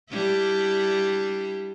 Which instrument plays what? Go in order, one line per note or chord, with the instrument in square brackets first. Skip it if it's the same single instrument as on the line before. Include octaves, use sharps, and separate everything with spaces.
[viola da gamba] G3 D4 E4